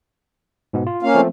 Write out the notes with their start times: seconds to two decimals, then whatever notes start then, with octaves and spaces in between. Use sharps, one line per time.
0.73 G#2 B2 B3
0.87 F4
1.03 A#3 C#4 F5
1.15 F3 A3 C4